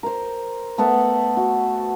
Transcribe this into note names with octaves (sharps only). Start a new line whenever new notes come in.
A#4 C5
A3 B3 A4 F#5
F#4